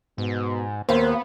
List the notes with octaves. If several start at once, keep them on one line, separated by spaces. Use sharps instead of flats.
G#2 B2
D#2 A#3 B3 C5 F5